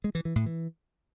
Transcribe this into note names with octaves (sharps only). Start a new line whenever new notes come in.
G#3
E3
E3
A2
E3